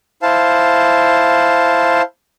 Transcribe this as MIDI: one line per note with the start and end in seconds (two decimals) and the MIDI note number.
0.22 2.02 64
0.22 2.02 72
0.22 2.02 77
0.22 2.02 81